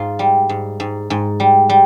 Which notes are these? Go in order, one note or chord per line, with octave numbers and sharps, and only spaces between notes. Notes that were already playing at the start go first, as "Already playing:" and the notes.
Already playing: G#2 F4
G3
G#2
G#2
G#2
G3
G3